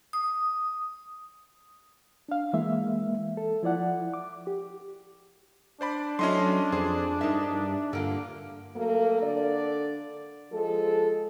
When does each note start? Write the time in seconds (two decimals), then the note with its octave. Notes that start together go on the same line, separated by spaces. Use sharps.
0.13 D#6
2.29 D4 F5
2.53 E3 G#3 A#3 E5
3.37 A4
3.63 F3 E4 D5 F#5
4.14 D6
4.47 G4
5.81 D4 C5 D5 B5
6.19 F#3 A3 C#4 E4 D#5 C6
6.72 F2 G#4 C5
7.21 G2 D#4 A#4 E5
7.93 G2 D3 A#3 F4
8.74 F#3 A3 A#3
9.22 D3 D5
10.52 F3 G#3 A4